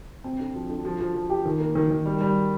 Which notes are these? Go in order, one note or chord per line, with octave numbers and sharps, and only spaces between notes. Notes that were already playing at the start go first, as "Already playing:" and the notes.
C4
D3
F3
D3
F3
F3
F3
G4
D#3
A#3
D#3
D#3
G3
G3